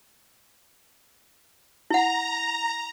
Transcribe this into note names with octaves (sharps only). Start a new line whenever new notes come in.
E4 F#5 A#5